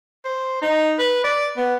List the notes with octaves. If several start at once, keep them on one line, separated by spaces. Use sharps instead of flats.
C5
D#4
B4
D5
B3